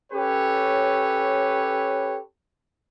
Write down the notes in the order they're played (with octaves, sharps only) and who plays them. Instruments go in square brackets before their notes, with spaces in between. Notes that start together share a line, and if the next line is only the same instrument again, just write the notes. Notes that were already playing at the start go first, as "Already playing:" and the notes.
[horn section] C#4 G4 A4 B4 C#5